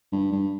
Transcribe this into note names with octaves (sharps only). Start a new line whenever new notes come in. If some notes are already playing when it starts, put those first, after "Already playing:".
G2
G2